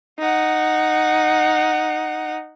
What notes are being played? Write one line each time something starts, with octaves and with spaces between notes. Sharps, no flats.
D#4 F#5